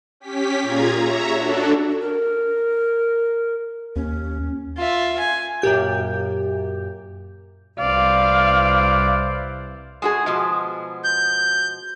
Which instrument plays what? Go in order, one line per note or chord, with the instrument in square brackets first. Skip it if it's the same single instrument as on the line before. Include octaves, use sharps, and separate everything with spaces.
[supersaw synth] C#4 G4 B6
A#2 F4 G#4 A#5 G#6
C#5 E5 A#5
D4 F#4 A4
[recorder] A#4
[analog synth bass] D#2 [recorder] C#4
[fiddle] F4 E5
G#5
[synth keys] F#2 A#2 G4 G6
[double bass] C2 [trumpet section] E4 B4 C5 [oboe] D5 [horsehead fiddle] F5
[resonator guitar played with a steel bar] G#3 F#4 G#4
B2 F3 G#3
[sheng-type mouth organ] G6